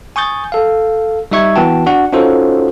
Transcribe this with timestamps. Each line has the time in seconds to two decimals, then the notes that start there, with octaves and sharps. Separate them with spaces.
0.16 G#5 C#6 D#6 G6 A6
0.52 A4 F5
1.31 G3 D#4 E5 C#6 G#6
1.56 E3 B3 F#4 G5 A5
1.86 D4 F#4 F#5
2.13 C#4 D#4 F4 F#4 A4 C5